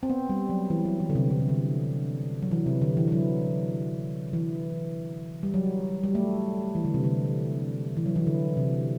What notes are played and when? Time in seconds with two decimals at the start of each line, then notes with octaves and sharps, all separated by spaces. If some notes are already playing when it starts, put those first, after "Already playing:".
0.03 C4
0.10 B3
0.30 G3
0.50 F#3
0.70 E3
0.85 F#3
1.00 E3
1.10 D3
1.15 C3
1.30 D3
1.40 C3
1.49 D3
2.42 F#3
2.51 E3
2.66 C3
2.82 D3
2.97 E3
3.08 E3
3.12 F#3
4.33 E3
5.43 G3
5.54 F#3
6.03 G3
6.15 A3
6.75 E3
6.85 D3
6.94 C3
7.04 D3
7.97 E3
8.06 F#3
8.16 E3
8.27 D3
8.57 C3